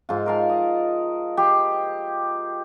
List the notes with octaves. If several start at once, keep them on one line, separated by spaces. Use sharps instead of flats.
G#2 F4
A#4 F5 A5
D#5
G4 C5